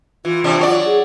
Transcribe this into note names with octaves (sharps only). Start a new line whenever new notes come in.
E3 F4
C3 E3 D4
F#3 C#5 D5
G#4